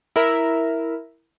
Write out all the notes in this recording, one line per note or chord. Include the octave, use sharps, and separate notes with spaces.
E4 A#4 E5